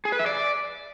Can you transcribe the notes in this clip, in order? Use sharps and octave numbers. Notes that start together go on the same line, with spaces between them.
G#4
B4
E5
D5